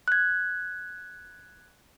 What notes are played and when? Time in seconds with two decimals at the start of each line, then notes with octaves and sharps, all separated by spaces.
0.08 F#6 G#6